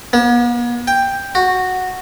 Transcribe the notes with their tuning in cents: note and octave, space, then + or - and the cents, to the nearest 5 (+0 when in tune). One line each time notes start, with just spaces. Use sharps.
B3 -45
G5 +10
F#4 -5